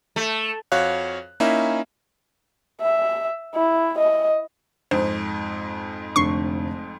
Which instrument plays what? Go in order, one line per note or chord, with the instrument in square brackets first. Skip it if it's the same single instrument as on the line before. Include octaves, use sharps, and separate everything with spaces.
[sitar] A3
[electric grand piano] F2 F#4 C#5 F5 F#6
A#3 C#4 D#4 E4 E5
[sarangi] E5
E4
D#5
[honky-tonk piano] F2 G#2 [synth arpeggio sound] C5
[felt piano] F1 D3 [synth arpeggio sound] C#6 C7